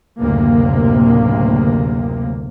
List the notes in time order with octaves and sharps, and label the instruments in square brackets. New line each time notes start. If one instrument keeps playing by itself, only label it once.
[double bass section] F#1 D2 A2 C3 A#3